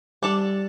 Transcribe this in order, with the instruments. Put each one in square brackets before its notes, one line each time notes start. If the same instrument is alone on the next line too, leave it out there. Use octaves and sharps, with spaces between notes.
[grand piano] G3 [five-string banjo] D4 A4 D5